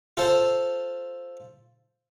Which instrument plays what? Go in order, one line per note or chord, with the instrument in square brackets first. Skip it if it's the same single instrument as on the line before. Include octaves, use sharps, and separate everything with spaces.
[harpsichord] F4 A4 C5